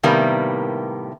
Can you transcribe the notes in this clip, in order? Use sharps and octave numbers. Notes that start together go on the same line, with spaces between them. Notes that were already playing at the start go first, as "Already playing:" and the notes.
A2 C3 D#3 G3 A#3 B3